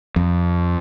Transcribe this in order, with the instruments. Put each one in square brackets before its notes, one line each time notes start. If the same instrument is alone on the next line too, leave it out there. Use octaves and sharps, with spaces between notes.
[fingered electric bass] F2